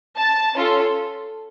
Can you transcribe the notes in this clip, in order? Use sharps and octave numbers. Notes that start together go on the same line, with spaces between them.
A5
C#4 F4 A4